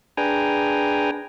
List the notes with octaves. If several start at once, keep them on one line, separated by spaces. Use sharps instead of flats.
D4 G#4 B4 G5 G#5 A#5